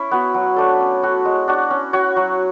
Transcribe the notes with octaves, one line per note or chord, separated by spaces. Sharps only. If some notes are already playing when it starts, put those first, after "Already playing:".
Already playing: C#4 E4
B3 F#4
F#3
A3 D4 A4
C#4
F#4 A4 C#5
G#3
D4 F#4
C#4
F#4 C#5
F#3